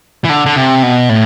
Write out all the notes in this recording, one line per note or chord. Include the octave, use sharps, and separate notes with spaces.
E3
D3
D3
C3
B2
A2